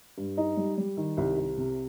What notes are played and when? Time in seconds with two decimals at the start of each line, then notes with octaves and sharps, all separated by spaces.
0.18 G2
0.37 D#4
0.57 G3
0.78 G3
0.97 D#3
1.17 C2
1.37 C2
1.57 C3